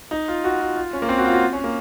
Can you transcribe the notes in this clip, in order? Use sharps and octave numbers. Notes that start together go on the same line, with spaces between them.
D#4
F4
F#4
F4
F4
C#4
A#3
C4
F#4
F4
F#4
C#4
A#3